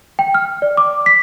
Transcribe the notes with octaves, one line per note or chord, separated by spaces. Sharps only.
G5
F6
D5
D6
B6